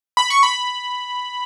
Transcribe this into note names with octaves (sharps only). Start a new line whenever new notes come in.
B5
C#6
B5